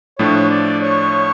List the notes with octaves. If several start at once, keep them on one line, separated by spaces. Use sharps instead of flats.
A2 F3 A3 D4 C#5
D5
C#5